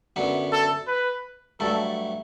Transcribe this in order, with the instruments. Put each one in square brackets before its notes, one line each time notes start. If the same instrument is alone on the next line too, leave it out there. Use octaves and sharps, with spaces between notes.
[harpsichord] F#2 D3 F#3 B3 E4
[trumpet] A4
B4
[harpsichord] G2 F#3 A3 E4 [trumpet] A4